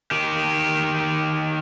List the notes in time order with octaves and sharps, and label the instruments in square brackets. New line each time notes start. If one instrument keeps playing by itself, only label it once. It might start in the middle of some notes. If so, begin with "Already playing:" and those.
[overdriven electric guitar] D#3 G4